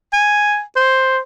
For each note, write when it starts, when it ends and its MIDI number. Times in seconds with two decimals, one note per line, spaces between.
0.13 0.61 80
0.76 1.19 72